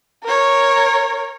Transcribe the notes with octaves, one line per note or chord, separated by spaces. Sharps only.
A#4 C#5